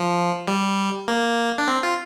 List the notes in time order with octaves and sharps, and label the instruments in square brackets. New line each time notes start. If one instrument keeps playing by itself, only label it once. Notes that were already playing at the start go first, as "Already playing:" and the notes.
Already playing: [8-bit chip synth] F3
G3
A#3
D4
C4
F4